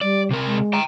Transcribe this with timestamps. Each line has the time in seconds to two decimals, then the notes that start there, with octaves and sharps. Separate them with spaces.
0.01 G3 D5
0.31 C3 A#4
0.46 G#3
0.74 G5 A#5